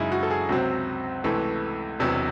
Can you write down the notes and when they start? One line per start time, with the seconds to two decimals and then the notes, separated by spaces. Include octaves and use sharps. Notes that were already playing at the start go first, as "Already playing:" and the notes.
Already playing: F#2 C#3 G#3 D#4 E4
0.12 F#4
0.23 A4
0.31 G#4
0.49 C#2 C3 F#3 C4 F#4
1.24 C#2 C3 E3 A3
1.99 E1 E2 C3 F#3